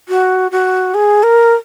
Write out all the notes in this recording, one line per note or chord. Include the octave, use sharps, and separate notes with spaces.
F#4
F#4
G#4
A#4